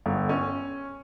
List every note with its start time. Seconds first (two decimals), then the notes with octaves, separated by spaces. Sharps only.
0.06 G1
0.29 C#4